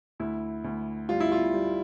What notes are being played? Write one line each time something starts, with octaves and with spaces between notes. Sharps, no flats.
D2 E4
D2
G3 F4
E4
F4
G3